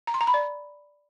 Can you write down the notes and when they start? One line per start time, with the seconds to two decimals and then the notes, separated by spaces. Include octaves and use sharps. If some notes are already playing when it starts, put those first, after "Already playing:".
0.07 A#5
0.14 C6
0.21 A#5
0.27 B5
0.34 D5